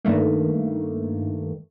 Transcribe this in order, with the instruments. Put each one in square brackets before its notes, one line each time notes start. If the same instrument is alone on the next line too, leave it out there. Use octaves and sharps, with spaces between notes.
[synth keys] G2 D#3 A3 A#3